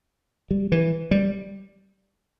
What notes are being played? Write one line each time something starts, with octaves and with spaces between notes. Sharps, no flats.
G3
E3
G3